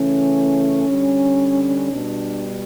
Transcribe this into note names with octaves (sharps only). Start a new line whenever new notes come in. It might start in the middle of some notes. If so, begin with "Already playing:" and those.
Already playing: C#3 E3 A3 C#4
D3 G3
B2 G3 D4